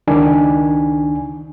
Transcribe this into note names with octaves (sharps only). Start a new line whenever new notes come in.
C#2 D#3 D4 G#5